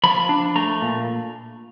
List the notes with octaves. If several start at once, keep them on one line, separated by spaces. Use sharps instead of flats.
F3 B5
D4
A3 A#5
A#2